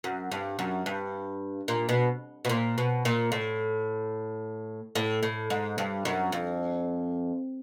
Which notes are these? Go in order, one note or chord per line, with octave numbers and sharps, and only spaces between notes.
F#2
G2
F#2
G2
A#2
B2
B2
A#2
B2
A#2
A2
A2
A2
G#2
G2
F#2
F2